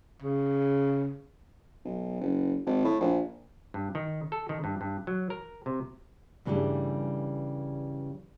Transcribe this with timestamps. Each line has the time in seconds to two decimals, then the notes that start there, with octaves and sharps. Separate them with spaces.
0.22 C#3
1.85 B1
2.21 F#1
2.66 G#1
2.84 A2
3.00 A#1
3.74 G2
3.95 D#3
4.32 A4
4.49 D#3
4.64 G2
4.81 G2
5.07 F#3
5.30 A#4
5.66 C3
6.45 G2 C#3 E3 F3 G3 A3